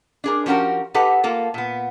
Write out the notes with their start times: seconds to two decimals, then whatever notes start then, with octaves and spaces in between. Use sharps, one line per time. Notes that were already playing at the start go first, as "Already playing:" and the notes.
0.24 D4 G#4 A#4
0.46 F3 C#4 F#4 G4 A#4
0.94 D#4 G4 A4 B4 F#5
1.23 A#3 F4 A4
1.54 A#2 B3